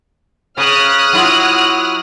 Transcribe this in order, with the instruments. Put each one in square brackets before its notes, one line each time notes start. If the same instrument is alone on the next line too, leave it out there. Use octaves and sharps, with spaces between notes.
[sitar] C#3 [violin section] D#6 F6 F#6
[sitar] F#3 E4 F4